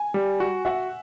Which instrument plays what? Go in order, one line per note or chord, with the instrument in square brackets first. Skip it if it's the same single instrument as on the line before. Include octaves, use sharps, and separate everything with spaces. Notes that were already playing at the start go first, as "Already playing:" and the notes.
Already playing: [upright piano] G#5
[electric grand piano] G3
F#4
[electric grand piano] F#4 [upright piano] E5 F#5